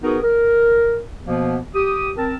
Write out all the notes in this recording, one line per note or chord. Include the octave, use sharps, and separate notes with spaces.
B3 D#4 F#4 G#4 A#4 B4
A#4
B2 F3 A#3 B3
G4 D#6
C4 A#4 A5